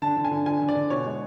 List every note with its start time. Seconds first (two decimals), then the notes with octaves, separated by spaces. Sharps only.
0.02 D3 A5
0.16 D3
0.25 G#5
0.31 D3
0.46 D3 G#5
0.62 D3
0.69 D5
0.75 D3
0.90 B2 C#5
1.06 G#3